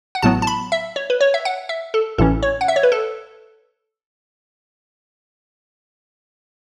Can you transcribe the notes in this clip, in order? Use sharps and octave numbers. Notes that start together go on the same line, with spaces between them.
F#5
A1 A2 F#3 B3 A5
A5
B5
E5
C#5
B4
C#5
E5
F#5
E5
A4
A1 A2 E3 C#4 A4
C#5
F#5
E5
C#5
B4
A4